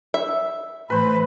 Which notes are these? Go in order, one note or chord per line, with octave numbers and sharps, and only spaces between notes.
E5
A2 E3 B4 C5 B5